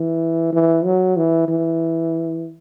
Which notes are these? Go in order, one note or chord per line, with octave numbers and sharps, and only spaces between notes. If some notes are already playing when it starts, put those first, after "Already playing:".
Already playing: E3
E3
F#3
E3
E3